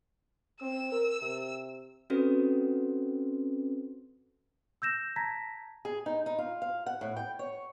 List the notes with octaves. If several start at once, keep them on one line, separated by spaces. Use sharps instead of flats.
C4 E6
A#4
C3
C4 C#4 F#4 A4 B4 C5
E6 G6 A#6 E7
A5 A#5 G#6 A#6 B6
G#4
D#4
D#4
F4
F5
F#5
A2
G5
C#5